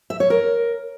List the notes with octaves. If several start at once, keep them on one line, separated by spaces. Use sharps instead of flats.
E5
C#5
A#4